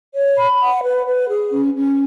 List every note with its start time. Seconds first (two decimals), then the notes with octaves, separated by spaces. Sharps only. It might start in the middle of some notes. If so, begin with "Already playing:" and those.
0.14 C#5
0.37 B5
0.60 F#5
0.83 B4
1.06 B4
1.28 G#4
1.51 C#4
1.74 C#4